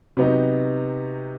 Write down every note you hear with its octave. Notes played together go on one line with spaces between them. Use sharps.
C3 F#3 B3 D#4 G4